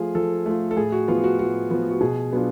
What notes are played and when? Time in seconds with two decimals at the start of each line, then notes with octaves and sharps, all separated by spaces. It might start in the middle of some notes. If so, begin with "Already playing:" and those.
Already playing: F3 A3 F4 G#4
0.14 F3 A4
0.46 A3 F4
0.71 A4
0.77 A2 G#4
0.92 F#4
1.08 F3 B3 F4
1.24 F#4
1.39 A2 F#4
1.70 F3 B3
1.90 F#4
2.01 B2 G#4
2.32 F#3 B3 D4 F4